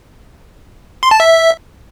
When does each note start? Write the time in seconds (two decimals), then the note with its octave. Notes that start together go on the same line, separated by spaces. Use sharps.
1.03 C6
1.11 A5
1.20 E5